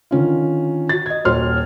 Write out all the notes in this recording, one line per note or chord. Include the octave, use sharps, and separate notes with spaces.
D3 D#3 C#4 F4
F#4 A6
D#5 G#6
D#1 F#4 C5 C#5 C6 F6